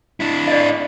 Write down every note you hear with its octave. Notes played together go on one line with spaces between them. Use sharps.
D4 E4
D5 D#5